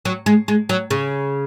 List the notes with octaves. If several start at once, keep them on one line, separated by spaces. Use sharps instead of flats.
F#3
G#3
G#3
F#3
C#3